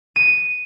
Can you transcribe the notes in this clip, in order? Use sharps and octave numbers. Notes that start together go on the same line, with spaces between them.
D#7